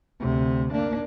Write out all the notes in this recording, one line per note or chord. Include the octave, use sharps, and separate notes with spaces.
D2 C3
A#3 D4